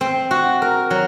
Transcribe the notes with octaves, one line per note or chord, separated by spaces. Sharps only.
C4
F#4
A#4
F#3